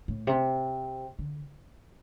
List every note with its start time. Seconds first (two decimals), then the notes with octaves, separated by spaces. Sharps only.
0.08 A2
0.27 C3
1.19 D3